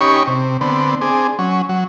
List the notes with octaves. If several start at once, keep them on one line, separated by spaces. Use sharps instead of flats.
C#4 D#4 G4 C#5 B5 C#6
C3
D3 B3 C4
C4 D4 G#4
F#3 C#4
F#3